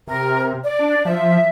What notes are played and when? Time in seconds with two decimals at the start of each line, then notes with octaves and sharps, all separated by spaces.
0.08 C3 A#4
0.64 D5
0.79 D4
1.05 F3 E5